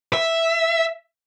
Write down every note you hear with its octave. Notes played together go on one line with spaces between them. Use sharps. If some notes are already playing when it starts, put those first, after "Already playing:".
E5